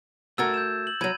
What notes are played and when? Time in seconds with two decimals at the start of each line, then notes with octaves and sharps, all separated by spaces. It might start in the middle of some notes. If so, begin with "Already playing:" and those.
0.38 A3 F#4 A#4 E6 G#6 A6
0.54 G6 E7
0.87 F#7
1.01 F3 F#3 B5 G#6 D#7